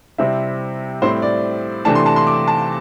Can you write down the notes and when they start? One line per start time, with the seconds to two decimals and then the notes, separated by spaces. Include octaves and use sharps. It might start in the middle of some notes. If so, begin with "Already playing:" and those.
0.18 C3 G3 C4 E4 E5
1.02 A2 G3 C4 E4 C5
1.22 D5
1.85 C3 E3 A3 D4 A5
1.95 C6
2.06 A5
2.16 C6
2.27 D6
2.47 A5